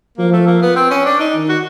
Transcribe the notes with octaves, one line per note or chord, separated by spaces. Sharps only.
F3 A#3
A3
A#3
B3
C4
C#4
D4
D#4
D#3
F#4